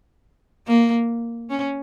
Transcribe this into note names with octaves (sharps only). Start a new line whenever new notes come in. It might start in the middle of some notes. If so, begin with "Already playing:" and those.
A#3
C#4